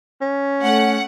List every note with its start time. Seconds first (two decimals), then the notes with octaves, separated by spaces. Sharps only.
0.21 C#4
0.63 A3 F#5